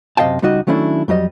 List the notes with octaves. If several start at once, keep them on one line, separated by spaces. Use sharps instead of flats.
F#2 C3 D#5 F5 G5 A5
C#2 G3 D#4 F#4 D#5
D#3 F#3 A3 C#4 D4 E4
F2 F#3 G3 D#5